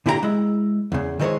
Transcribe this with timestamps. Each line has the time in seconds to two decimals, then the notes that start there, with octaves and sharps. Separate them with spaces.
0.06 A#2 D3 E4 G4 A#4 A#5
0.23 G#3 E4
0.92 E2 C#3
1.19 D#3 E3 G#3 A4 C5 C#5